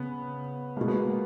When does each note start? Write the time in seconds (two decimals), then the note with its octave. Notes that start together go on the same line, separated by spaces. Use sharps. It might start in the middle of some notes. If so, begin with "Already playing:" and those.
Already playing: C#3 B3
0.77 B2 G#3 A#3
0.88 B3
0.99 A#3